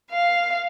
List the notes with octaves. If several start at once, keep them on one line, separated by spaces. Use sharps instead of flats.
F5